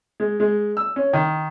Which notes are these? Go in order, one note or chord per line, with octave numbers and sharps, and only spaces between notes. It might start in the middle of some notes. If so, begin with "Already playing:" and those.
G#3
G#3
E6
C#4
D#3